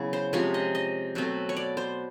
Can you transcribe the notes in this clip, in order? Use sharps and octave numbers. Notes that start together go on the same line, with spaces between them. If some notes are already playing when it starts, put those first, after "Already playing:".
Already playing: C#3 F#3 B3 E4
C5
C3 F3 G#3 C#4 C#5
D#5
D#5
B2 F#3 A3 C4
C#5
D5
C5